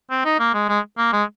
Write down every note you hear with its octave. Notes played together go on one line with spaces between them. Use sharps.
C4
D#4
A#3
G#3
G#3
A#3
G#3